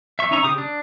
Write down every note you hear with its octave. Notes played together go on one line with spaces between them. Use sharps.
E5 C#6
C#4 D#4 E5 A#5 C#6
C#3 G4 D#6
D4